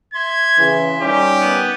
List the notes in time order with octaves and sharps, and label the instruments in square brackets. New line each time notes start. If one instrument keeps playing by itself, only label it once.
[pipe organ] E5 C6 [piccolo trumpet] G#6
[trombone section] C#3 E3
[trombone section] D#3 G3 C#4 [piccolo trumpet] G4
[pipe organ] B3 B4